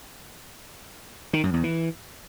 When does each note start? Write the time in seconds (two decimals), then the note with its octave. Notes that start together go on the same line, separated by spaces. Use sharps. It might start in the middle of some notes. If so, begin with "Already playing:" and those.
1.33 D#3
1.43 F#2
1.54 E2
1.64 E3